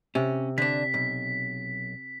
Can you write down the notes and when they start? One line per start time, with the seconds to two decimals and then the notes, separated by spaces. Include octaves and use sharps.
0.15 C3 C#4
0.58 D3 D4 B6
0.94 B1